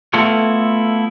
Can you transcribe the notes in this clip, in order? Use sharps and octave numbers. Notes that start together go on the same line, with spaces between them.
A3 B3 E4 F4 A4 C#5